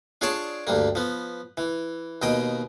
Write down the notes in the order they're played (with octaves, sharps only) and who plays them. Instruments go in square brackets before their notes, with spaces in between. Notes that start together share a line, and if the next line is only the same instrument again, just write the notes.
[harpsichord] D4 F4 G#4 C#5 D5 A5
D2 G2 G3 A#3
F3 B3
E3
D#2 B2 D#5 G5 D#6